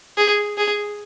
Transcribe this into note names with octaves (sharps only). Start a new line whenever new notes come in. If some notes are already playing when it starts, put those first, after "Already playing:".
G#4
G#4